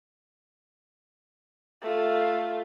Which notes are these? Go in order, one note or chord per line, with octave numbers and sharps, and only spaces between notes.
A3 F4